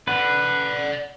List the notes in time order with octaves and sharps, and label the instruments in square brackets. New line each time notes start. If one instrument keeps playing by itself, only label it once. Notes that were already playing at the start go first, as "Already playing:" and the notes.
[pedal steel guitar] B4 [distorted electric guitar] D5 F#5